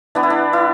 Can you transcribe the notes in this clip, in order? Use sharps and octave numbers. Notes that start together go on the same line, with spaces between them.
E3 B3 D4
E4
D4
E4